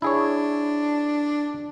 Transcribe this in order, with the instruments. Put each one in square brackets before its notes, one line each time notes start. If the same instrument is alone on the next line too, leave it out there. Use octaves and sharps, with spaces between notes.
[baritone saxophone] D4 [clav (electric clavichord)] E4 G#4 C#5